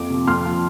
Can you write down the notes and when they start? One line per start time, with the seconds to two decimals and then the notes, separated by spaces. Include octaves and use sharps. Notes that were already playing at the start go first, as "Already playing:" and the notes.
Already playing: F2 D6
0.10 C3 F3
0.27 F2 C6 F6
0.45 F3